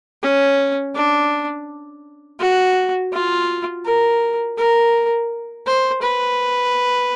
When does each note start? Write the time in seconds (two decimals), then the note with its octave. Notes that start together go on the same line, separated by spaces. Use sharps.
0.23 C#4
0.95 D4
2.40 F#4
3.13 F4
3.85 A#4
4.58 A#4
5.66 C5
6.03 B4